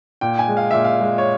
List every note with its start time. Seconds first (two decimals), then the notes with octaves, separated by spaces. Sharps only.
0.21 A#2 G5
0.39 G#5
0.48 G#3
0.57 F5
0.71 A#2 E5
0.84 F5
1.01 G#3
1.18 C#5